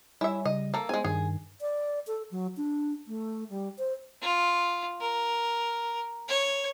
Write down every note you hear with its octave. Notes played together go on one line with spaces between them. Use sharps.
G3 E4 C#5 E5 G#5
C#3 G3 D#5
A#3 A4
G#3 B3 G#4 C5 G#5
G2 D#3 G#4
D5
A4
F#3
D4
A3
G3
C5
F4
A#4
C#5